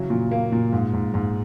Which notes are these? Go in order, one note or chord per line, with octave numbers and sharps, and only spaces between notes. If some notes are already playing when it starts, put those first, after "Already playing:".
Already playing: C#3 E3 F#3
A#2
A#3
A#2
G#2
G#2
G#2